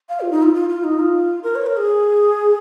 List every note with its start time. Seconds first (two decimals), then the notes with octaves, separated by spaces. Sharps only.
0.09 F5
0.21 F4
0.31 D#4
0.43 F4
0.54 F4
0.69 F4
0.84 D#4
0.99 F4
1.43 A#4
1.55 C#5
1.66 A#4
1.77 G#4